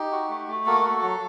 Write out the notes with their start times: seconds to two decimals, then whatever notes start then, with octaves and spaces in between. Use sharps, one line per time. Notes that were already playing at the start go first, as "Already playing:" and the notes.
Already playing: D#4 G4
0.12 F#4
0.29 A3
0.48 A3
0.66 A#3 F#4 A4
0.84 F#4
1.02 F#3